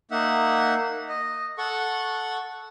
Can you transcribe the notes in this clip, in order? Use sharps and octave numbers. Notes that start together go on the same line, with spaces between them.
A#3 D#4 E5 F#5
D#5
A4 F#5 C#6